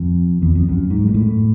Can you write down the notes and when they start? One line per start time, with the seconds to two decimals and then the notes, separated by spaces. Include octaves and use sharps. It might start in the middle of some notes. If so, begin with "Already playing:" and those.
Already playing: F2
0.42 E2
0.55 F2
0.69 F#2
0.90 G#2
1.08 A#2
1.14 A2